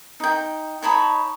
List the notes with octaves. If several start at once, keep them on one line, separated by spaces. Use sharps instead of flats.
D#4 G5
D#4 C#5 A5 B5